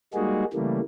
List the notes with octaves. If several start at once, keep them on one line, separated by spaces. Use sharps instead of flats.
G3 G#3 A#3 D#4 F#4 G#4
C#3 E3 G3 A3 A#3